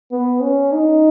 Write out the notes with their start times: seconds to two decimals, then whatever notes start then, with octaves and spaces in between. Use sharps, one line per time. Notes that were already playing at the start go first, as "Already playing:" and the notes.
0.12 B3
0.42 C#4
0.72 D#4